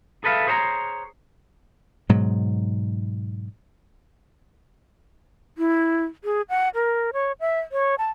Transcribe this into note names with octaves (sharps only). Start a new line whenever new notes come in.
G#4 A4 B4 E5 F5
G#4 C5 C#5 A5 A#5
G#2 B2 F#3
E4
G#4
F#5
A#4
C#5
E5
C#5
A5